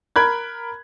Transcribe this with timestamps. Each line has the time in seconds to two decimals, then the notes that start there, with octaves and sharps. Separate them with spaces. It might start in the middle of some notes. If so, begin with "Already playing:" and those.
0.16 A#4 B5 F#6 G#6